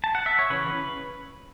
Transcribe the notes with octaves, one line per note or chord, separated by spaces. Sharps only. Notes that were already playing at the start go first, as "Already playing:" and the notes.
A5
F#5
E5
C#5
C#3 E3 C#4 B4